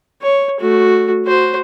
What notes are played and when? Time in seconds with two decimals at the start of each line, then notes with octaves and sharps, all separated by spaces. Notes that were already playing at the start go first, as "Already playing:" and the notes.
0.22 C#5
0.59 A3 F#4
1.25 F#4 C5